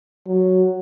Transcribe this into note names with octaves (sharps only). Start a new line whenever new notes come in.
F#3